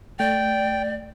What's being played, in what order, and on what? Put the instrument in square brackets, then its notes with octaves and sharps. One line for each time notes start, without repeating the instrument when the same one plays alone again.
[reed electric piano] A3 A6 [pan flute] D5 [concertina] G5